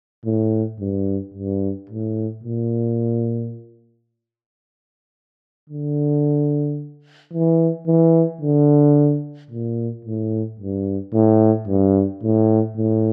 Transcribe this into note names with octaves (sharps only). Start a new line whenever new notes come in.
A2
G2
G2
A2
A#2
D3
E3
E3
D3
A#2
A2
G2
A2
G2
A2
A2